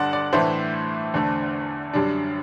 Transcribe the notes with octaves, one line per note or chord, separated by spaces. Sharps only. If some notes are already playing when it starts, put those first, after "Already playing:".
Already playing: G1 G2 D3 D5 F#5 A5 C6
D5
A2 E3 A3 D4 C5 E5
E2 D3 A3
F#2 D3 G3 D4